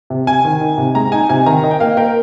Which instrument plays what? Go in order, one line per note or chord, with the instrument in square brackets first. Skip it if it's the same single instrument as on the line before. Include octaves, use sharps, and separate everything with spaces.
[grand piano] C3
[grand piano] C3 [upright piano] G#5
[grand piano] D#3
D#4
C3
[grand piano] G#3 [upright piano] A#5
[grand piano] D#4 [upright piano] G#5
[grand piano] C3 [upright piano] G#5
[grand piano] D#3 [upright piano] A#5
[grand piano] D#5
[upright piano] G5
[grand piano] A#3 [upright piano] F5
[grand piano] A#4 [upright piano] G5